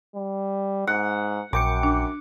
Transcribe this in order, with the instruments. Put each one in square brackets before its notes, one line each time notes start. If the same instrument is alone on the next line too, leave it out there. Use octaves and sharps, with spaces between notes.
[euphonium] G3
[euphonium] G#2 [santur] F#5
[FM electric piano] A#1 G5 C#7 [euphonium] F#2 [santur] D6
[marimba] D4